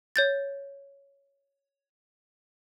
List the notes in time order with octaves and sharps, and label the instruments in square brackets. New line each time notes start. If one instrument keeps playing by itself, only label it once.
[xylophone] C#5 G6 A6